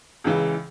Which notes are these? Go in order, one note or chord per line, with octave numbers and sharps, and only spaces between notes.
C#2 C#3 E3